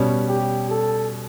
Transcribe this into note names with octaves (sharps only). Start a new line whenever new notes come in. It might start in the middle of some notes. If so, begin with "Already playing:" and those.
Already playing: B2 G3 C#4
G4
A4